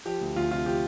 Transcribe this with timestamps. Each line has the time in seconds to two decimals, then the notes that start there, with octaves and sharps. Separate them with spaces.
0.05 F3 G4
0.21 D2
0.36 D2 F4
0.51 C3 F4
0.66 F3 G4